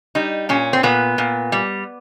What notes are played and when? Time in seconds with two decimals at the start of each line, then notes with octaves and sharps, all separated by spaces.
0.15 G3 D#4
0.49 A#2 C#4
0.73 C4
0.83 A#2 B3
1.18 A#2
1.52 G3